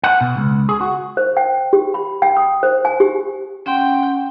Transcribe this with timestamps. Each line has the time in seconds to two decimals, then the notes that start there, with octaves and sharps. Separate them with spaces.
0.03 F#5
0.21 B2
0.37 C#2
0.69 G#4
0.81 F#4
1.17 C5
1.37 G5
1.73 G4
1.94 B5
2.22 G5
2.37 D#6
2.63 C5
2.85 G#5
3.00 G4
3.66 C#4 F#5 G5 C6